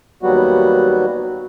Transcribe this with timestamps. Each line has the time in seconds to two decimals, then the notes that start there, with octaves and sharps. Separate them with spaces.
0.23 D#2 F#3 G3 B3 F#4